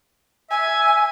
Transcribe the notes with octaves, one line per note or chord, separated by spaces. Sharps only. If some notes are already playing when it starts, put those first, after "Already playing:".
E5 G#5